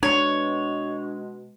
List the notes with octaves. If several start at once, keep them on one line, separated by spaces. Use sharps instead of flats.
B2 G#3 D4 C#5